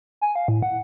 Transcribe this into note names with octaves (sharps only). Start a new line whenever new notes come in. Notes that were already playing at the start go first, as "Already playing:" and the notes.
G#5
F5
A2
F#5